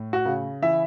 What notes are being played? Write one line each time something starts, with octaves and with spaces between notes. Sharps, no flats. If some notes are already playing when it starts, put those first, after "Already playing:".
Already playing: A2
F#4
C#3
E3 E4 E5